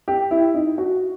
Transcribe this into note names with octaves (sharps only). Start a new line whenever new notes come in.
G4
E4
D#4
F#4